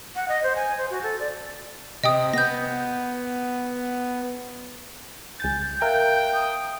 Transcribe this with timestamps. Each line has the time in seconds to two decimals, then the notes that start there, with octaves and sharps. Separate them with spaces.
0.16 F#5
0.28 D#5
0.43 C5
0.56 G#5
0.78 C5
0.90 F#4
1.03 A4
1.20 D5
2.04 C3 D#5 G5 D#6
2.33 B3 G6 A#6
5.40 C#2 G#5 G6 A6
5.82 A#4 E5 F5 G5 F#6
6.33 D#6